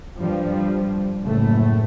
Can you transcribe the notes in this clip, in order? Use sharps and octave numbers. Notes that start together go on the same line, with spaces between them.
G2 F3 G3
F#1 A2 A3